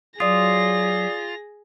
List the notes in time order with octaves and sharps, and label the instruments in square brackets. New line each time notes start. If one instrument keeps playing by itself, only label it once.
[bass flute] F#3 [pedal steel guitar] F4 [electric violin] G#4 A#6 [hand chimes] D5 D#6